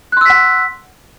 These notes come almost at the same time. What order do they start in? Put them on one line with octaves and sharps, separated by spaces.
F#6 C6 E6 B6 F#5